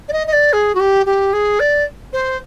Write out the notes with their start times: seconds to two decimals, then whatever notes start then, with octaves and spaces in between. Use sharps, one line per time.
0.09 D5
0.13 D#5
0.27 D#5
0.33 D5
0.53 G#4
0.75 F#4
0.80 G4
1.06 G4
1.33 G#4
1.60 D5
2.13 C5